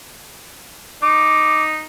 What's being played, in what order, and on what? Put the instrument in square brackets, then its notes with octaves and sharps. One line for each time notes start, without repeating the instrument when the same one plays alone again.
[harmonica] D#4 [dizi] D6